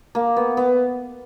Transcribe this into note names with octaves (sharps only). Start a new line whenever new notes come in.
A#3
B3
B3